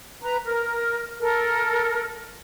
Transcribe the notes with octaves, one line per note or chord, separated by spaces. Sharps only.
B4 A#5
A#4
A4 A#4